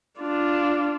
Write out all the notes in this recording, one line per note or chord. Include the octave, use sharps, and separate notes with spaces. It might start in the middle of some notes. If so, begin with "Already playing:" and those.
D4 F4